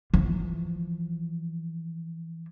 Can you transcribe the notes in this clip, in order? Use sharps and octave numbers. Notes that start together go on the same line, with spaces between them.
E3 F3